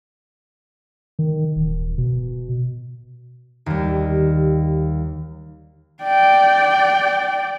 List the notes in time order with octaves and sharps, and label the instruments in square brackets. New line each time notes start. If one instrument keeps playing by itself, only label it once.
[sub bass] D#3
D#1
B2
[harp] D#2 G3
[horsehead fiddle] D5 G5